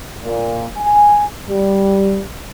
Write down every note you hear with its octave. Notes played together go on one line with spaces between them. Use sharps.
A#2
G#5
G3